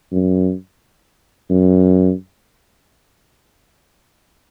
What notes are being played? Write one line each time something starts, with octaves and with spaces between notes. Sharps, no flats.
F#2
F#2